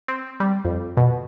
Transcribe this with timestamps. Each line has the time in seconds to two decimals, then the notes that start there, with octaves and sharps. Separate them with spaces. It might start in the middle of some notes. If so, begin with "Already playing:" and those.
0.08 C4
0.40 G3
0.65 F2
0.97 B2